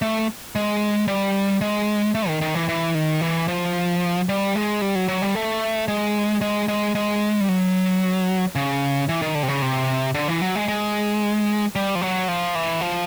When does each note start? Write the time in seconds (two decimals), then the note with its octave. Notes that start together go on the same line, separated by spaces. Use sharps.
0.02 A3
0.56 G#3
1.08 G3
1.61 G#3
2.15 A3
2.28 D#3
2.41 D#3
2.55 E3
2.69 E3
2.95 D#3
3.21 E3
3.48 F3
4.29 G3
4.56 G#3
4.82 G3
4.95 F#3
5.08 F#3
5.22 G3
5.35 A3
5.88 G#3
6.41 G#3
6.68 G#3
6.95 G#3
7.40 G3
7.49 F#3
8.56 C#3
9.09 E3
9.22 D#3
9.35 D3
9.43 C3
9.48 C#3
9.62 C3
10.14 D3
10.28 E3
10.41 F#3
10.56 G#3
10.68 G#3
11.75 G3
11.95 F3
12.01 F#3
12.28 F3
12.55 E3
12.81 F3